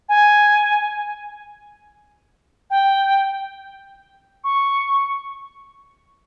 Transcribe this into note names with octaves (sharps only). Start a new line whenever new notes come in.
G#5
G5
C#6